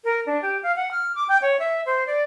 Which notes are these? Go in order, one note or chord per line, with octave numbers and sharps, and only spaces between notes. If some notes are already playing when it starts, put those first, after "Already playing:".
A#4
D4
G4
F5
F#5
F6
D6
G5
C#5
E5
C5
D5